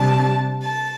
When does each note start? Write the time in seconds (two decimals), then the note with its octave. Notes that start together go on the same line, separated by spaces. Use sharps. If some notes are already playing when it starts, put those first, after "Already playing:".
Already playing: C3 G3 D4 A5
0.62 A5